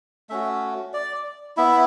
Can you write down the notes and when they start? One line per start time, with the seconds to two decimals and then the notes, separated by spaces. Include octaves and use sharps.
0.29 A3 C#4 F#4 E5
0.93 D5
1.57 B3 E4 E5